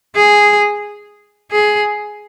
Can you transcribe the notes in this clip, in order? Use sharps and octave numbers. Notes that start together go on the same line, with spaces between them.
G#4
G#4